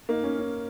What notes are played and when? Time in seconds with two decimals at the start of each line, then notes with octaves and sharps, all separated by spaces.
0.09 A#3 D#4
0.24 C#4
0.39 C#4